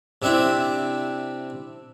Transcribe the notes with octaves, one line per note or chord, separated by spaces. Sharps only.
C3 C4 D4 E4